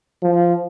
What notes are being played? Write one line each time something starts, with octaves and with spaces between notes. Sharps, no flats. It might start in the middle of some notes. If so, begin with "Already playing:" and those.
F3